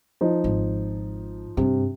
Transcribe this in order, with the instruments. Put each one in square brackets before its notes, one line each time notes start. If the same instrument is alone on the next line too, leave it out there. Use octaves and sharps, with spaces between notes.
[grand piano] F3 D#4
[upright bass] G#1
[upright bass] G2 [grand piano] C3